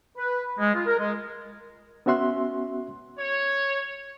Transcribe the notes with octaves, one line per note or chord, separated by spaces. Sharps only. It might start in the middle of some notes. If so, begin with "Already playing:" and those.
B4
G#3
F4
A#4
G#3
B3 C#4 F#4 E5 C6 F#6
C#5